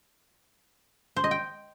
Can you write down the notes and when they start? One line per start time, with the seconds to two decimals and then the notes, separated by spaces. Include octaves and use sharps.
1.16 C5
1.24 D#5
1.31 G5